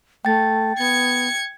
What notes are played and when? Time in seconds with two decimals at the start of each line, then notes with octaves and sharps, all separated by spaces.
0.25 A3 G5 A6
0.79 B3 G#6 C#7